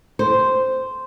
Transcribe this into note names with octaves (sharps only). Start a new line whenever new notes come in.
C5